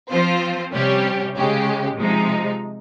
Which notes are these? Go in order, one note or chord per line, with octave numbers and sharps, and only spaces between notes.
F3 C4 F4 C5
C3 G3 C#4 G4 C#5
C#3 G#3 C#4 G4
C3 F3 G#3 D#4